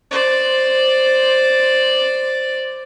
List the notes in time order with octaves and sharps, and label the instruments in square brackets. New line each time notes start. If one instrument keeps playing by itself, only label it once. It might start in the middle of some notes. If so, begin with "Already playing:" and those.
[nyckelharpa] C5 D5